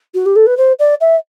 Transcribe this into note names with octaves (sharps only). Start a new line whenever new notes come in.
F#4
G4
A4
B4
C5
D5
E5